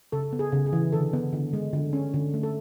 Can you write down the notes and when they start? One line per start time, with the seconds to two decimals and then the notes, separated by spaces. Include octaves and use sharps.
0.12 C#3 A4
0.33 B3
0.39 G#4
0.52 C#3
0.66 G#4
0.73 E3
0.93 D3 A4
1.13 B3
1.33 D3
1.53 G#3
1.73 D3
1.93 C#4
2.14 D3
2.34 A3
2.43 A4